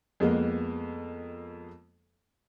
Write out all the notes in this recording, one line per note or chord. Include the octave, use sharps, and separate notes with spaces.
F2 G#3 A#3 B3